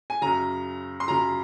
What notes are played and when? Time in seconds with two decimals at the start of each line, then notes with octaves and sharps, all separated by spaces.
0.10 G#5
0.21 F#2 C#3 A#5
1.00 C6
1.08 F#2 C#3 A#5